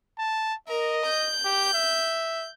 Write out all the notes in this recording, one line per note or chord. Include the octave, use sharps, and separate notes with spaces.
A5
A#4 D#5
G6
G4
E5